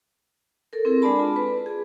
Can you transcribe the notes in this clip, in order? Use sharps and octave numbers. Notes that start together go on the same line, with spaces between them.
A4 A#4
C4 E4 G#4 A#4
G#3 D4 D5 A5 B5
F4
B4
G#4